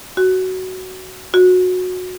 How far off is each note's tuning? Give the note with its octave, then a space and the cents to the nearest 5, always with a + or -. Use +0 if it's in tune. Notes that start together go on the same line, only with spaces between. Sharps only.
F#4 +10
F#4 -20